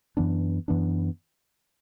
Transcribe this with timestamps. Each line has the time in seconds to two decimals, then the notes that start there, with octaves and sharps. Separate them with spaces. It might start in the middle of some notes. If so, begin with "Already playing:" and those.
0.17 F#2 E3 B3 D4
0.68 F#2 E3 B3 D4